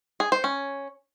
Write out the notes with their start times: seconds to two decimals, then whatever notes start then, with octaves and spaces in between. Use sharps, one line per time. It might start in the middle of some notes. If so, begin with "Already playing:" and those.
0.20 G#4
0.32 C5
0.44 C#4